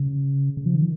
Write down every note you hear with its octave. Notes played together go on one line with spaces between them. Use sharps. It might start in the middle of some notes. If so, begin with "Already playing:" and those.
Already playing: C#3
C#3
F3
D#3